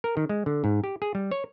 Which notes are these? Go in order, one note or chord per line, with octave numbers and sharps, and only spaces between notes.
A#4
D#3
G#3
D3
G#2
G4
G#4
G3
C#5